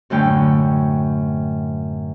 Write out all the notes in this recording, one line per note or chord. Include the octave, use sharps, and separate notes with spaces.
F#2 A2 D3 G5